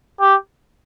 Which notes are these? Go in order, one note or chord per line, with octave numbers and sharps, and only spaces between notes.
G4